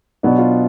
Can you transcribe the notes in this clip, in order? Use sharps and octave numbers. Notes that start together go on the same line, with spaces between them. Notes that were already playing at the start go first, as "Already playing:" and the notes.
B2 F#3 B3 D4
F4